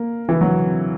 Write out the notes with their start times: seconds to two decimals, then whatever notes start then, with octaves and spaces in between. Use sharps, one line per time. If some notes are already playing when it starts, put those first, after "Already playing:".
Already playing: A#3
0.29 E3
0.41 F#3